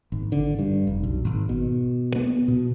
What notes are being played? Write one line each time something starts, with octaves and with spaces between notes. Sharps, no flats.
G#1
D3
G2
F1
B1
G#1
B2
B3
B2